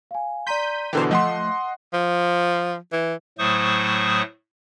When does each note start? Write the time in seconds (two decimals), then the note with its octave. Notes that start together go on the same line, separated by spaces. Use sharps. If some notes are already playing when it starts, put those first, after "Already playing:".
0.11 F5 G#5
0.47 D5 A#5 C6 G6 B6 D#7
0.93 B2 D3 E3 G4 A#4 C5 D6
1.11 F3 A3 D#5 F#5 C6
1.93 F3
2.93 E3
3.39 A2 F#3 A3 C5 C#6 D#6